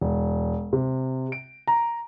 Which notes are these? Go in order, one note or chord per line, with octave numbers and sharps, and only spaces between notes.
E1
C3
D7
A#5